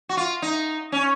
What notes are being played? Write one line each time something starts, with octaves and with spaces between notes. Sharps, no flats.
F#4
F4
D#4
C#4